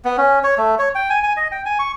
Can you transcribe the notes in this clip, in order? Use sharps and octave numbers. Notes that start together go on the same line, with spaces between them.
B3
C#4
C#5
A3
C#5
G5
G#5
G#5
D#5
G5
G#5
C#6